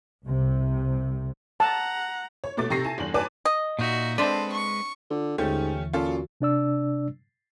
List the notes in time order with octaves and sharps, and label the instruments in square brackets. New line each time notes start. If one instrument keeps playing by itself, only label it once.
[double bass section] C2 C3
[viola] F#5 A#5 [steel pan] A5
[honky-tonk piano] C#5
B2 A3 D6 A6
C3 G4 A4 C#6 A#6 C7
E4 G#5 A5
G1 E2 F#7
B4 C#5 D5 G#5 A5 D6
[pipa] D#5
[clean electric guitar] A#2 D#4 [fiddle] F#4 E5
[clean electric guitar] G#3 B4 [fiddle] C4 A4 [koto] D4 C5 E5
[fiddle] C#6
[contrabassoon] D3 [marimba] F4
[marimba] D#2 D3 [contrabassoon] G#2 [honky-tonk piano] A3 C#4 [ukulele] G4
[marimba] E3
[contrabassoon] A#2 [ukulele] C#4 [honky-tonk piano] F4 A4
[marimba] F#4
[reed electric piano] C3 D4 D5 E6